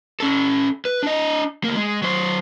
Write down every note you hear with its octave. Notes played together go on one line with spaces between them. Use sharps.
C#4 A4
B4
D4 D#5
D2 A#3
G#3
F#3 C5